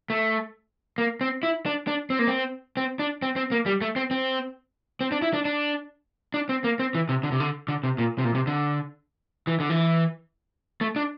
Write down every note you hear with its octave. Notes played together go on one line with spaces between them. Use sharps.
A3
A#3
C4
E4
D4
D4
C4
A#3
C4
C4
D4
C4
C4
A#3
G3
A3
C4
C4
C4
D4
E4
D4
D4
D4
C4
A#3
C4
E3
C3
D3
C3
D3
D3
C3
A#2
C3
A#2
C3
D3
E3
D3
E3
A3
D4